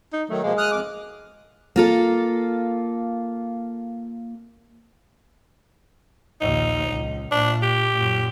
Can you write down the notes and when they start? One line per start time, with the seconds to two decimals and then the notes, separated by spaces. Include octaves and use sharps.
0.13 D#4
0.29 D#3 F#3 A3
0.43 B2 F3 G#3 A#3
0.58 D#6 F6 F#6
0.71 F2 D6
1.76 A#3 F4 A4
6.41 A#1 D#2 D#4
6.88 C#2
7.32 A#2 D4
7.62 G4
7.94 F#2 A#2